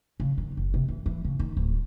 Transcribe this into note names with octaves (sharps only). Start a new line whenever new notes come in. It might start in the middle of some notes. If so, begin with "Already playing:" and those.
C#3
D#3
F#1
C3
E3
E3
C#3
D#3
D1